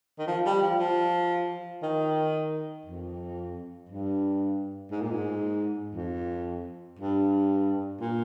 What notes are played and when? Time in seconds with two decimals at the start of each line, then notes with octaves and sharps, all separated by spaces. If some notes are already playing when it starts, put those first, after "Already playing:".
0.19 D#3
0.27 F3
0.46 G3
0.62 F3
0.79 F3
1.83 D#3
2.86 F2
3.89 G2
4.91 G#2
5.01 A#2
5.11 G#2
5.95 F2
6.99 G2
8.01 A#2